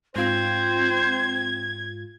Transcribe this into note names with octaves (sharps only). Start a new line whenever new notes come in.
G#2 C4 F4 C5 G#6